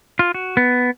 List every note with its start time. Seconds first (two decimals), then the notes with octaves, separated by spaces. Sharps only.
0.19 F4
0.34 F#4
0.57 B3